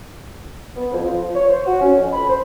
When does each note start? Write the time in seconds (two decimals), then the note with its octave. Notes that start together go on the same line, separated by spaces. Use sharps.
0.76 B3
0.92 F2
1.04 F3
1.22 F3
1.34 C#5
1.49 C5
1.66 F#4
1.81 C#4
1.96 F2
2.13 B5
2.29 C5